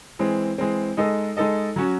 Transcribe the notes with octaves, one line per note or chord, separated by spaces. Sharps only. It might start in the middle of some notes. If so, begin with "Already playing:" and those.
E3 G#3 C4
E3 G#3 C4
G#3 D#4 A4 D#5
G#3 D#4 A4 D#5
F#3 C#4 F#4